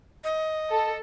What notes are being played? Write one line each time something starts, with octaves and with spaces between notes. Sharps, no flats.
D#5
A4